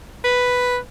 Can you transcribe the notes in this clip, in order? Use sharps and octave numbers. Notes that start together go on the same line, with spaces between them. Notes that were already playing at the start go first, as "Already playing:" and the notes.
B4